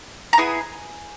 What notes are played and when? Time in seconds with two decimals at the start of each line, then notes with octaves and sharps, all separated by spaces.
0.33 A#5
0.38 B3 E4 G#4 G#5